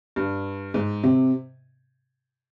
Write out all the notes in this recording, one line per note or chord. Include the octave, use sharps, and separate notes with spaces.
G2
G#2
C3